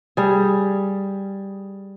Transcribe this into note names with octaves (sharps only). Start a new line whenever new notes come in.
G3 G#4